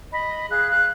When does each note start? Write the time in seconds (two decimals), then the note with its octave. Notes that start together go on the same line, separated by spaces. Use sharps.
0.13 D#5 B5
0.50 G#4 F5 F#6
0.71 F5 F#6